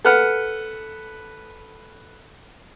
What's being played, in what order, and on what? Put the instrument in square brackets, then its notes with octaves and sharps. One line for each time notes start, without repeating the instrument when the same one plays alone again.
[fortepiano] A4 B4 F#5 F6